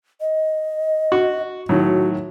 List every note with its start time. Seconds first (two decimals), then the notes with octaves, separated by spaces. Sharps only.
0.21 D#5
1.12 F#4
1.69 A2 D#3 F#3 F#4